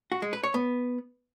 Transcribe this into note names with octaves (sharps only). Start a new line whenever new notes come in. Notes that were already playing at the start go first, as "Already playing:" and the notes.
F#4
G#3
B4
C#5
B3